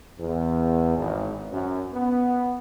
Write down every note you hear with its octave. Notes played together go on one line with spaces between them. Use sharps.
E2
G#1
F#2
B3